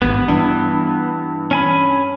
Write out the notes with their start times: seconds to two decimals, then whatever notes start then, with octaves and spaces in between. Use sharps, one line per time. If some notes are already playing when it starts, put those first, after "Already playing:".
0.02 G#1 G2 B3
0.28 G2 E3
1.51 C#4 G#5 B5